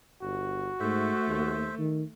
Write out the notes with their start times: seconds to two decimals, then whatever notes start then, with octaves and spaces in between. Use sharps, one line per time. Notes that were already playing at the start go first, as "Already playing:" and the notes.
0.22 G1 F#4
0.80 G#2 A3 C5 E5
1.27 D#2
1.78 D#3